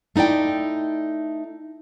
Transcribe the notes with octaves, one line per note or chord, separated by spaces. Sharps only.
A3 D#4 E4 D5 G5